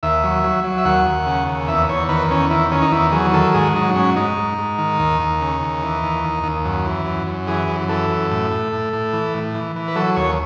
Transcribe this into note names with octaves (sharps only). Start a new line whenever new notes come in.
D#2 E5
F#3
F#3
F#3
E5
D#2 F#5
D#2
C#3
D#2
E2 E5
E2 C#5
D#3 B4
E2 C#4
D#3 E4
D#3 C#4
D#4
E2 E4
F#3 G#4
D#3 A4
G#2 G#4
F#3 D#4
G#2 C#4
G#2 D#4
G#2
G#2
D#3
D#2
D#2
C#3
D#2
E3
D#2
D#2
D#2
F#2
E3
F#2
F#2
E3 G#4
F#2
E3 A4
F#2
A2
A2
A2
A2
E3
A2
E3
E3
B4
F#3 A4
D#2 C#5